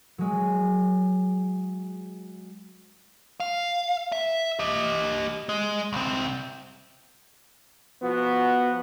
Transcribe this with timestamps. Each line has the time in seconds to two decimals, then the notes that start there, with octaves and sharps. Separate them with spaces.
0.18 F#3 G#3
3.40 F5
4.12 E5
4.59 G4 D#5
5.49 G#3
5.93 C2 C4
8.01 F3 B3 F#4